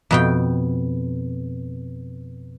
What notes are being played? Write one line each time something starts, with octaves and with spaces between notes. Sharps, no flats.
F2 B2 G5